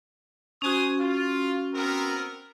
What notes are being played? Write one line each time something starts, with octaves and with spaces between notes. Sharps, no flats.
C#4 F#4 C5 G#5 D#6
F4
B3 C4 A#4